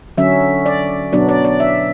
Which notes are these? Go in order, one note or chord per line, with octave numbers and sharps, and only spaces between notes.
D3 F#3 C#4 E5
D5
B2 F#3 B3 D4 D5
D5
D5
E5